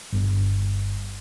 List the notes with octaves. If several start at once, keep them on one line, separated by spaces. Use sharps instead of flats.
G1